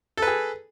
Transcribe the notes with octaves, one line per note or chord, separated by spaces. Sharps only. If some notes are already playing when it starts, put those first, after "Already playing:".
G#4 A4 B4